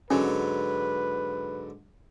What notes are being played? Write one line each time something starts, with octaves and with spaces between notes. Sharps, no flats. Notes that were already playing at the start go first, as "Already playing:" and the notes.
G#2 D3 F#3 C#4 B4